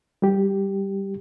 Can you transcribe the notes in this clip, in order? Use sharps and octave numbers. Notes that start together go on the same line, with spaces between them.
G3 G4